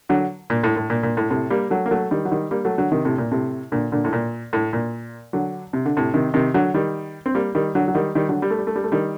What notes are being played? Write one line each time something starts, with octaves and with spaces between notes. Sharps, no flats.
D3 F#3
A#2
A2
A2
A#2
A#2
A2
A2 C3
G3 A#3
F#3 A3
A#3
F#3 A3
D#3 G3
F#3
D#3 G3
G3 A#3
F#3 A3
D3 F#3
C3 D#3
A2 C3
A#2
A2 C3
A#2 D3
A#2 D3
A2
A#2
A2
A#2
D3 F#3
C3
D3
A2 C3
C3 D#3
C3 D#3
D3 F#3
D#3 G3
C4
G3 A#3
D#3 G3
D3 F#3
F#3
D#3 G3
D#3 G3
D3 F#3
G3
A3
G3
A3
G3
A3
D#3 G3